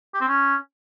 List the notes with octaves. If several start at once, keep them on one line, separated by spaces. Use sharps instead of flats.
G4
C4
C#4